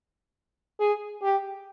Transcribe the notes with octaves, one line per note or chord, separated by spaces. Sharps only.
G#4
G4